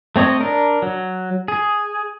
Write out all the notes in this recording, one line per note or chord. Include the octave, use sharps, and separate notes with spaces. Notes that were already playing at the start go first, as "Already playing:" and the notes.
A3 C4 C#5 D#5
D4 A#4
F#3
G#4